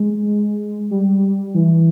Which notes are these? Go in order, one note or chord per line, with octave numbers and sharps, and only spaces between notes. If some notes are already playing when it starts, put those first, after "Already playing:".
Already playing: G#3
G3
E3